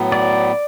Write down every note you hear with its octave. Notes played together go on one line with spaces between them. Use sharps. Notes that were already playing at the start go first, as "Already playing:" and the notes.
Already playing: A2 F#3 B3
D5